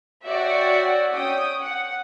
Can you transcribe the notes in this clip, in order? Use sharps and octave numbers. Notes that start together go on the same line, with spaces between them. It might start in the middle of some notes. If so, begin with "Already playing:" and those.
F#4 C#5 D5 E5 F#5 G5
C#4 G5 D#6
F#5